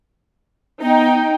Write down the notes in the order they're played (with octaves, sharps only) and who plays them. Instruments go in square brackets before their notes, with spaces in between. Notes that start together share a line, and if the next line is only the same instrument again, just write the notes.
[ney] B3 [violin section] D#4 G5